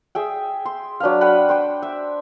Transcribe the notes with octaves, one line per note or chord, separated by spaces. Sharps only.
G#4 E5 G5
C6
F#3 D4 B4 F5
B4 F#5 G5 B5
C5 G5
E5